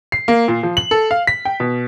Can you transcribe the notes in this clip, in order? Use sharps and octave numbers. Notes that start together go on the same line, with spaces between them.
C7
A#3
A#2
F3
F#7
A4
F5
B6
G5
B2